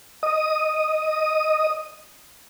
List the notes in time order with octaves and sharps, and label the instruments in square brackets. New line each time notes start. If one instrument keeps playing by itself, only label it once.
[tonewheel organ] D#5 D#6